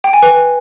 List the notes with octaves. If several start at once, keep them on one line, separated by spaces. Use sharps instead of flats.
G5
G#5
B4